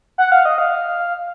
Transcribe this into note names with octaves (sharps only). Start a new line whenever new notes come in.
F#5
F5
D#5
F5